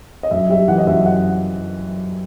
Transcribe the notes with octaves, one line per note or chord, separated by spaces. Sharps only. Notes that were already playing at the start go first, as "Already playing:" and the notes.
D#5
F#2 E5
G3 E5
E3 F#5
D#5
F#2 E5
F#5